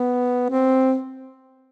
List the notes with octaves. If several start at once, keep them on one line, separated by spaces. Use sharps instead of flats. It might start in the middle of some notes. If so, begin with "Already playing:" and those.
Already playing: B3
C4